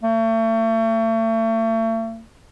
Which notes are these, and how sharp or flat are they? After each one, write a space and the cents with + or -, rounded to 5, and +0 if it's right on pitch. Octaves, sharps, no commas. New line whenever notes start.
A3 +40